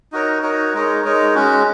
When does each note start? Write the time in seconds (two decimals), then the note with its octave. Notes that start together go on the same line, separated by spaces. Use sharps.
0.12 D#4 F#4 A#4 C#5
0.43 D#4 F#4 A#4 C#5
0.74 G#3 D#4 A#4 C#5
1.04 G#3 D#4 A#4 C#5
1.35 G#3 C#4 F#4